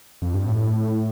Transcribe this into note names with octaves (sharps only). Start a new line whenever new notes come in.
F2
G2
A2